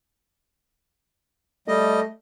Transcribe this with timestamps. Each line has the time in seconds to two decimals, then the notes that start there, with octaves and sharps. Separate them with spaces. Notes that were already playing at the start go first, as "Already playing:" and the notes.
1.68 G3 A3 D#5